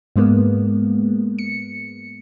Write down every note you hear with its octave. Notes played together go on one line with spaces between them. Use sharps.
G#2 G#3 A#3 B3
C#7